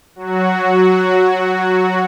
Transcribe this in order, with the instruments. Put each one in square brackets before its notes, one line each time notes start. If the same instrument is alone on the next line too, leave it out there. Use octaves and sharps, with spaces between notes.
[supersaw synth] F#3 F#4